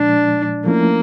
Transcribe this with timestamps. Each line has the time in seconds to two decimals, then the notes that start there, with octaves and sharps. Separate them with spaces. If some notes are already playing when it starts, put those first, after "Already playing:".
Already playing: A#2 F3 G#3 D4
0.66 F3 A3 A#3 C#4 E4